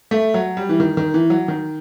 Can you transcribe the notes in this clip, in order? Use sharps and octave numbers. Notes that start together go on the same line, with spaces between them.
A3
F#3
G3
E3
D#3
D#3
E3
F#3
D#3